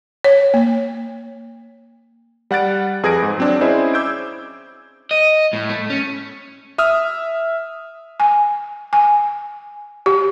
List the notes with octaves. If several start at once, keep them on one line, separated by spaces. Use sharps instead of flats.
C#5
A#3
G3 F#5 F#6 A6 D7
F2 G#4 B4 G#6 A#6 D7
G#2
F#3 C4 D4
C#4 E4 G#4 C5 D5 D#5
D6 E6 G6 G#6 D7
D#5
A2
A3
C#4
E5 D#6 F6
G#5
G#5
G4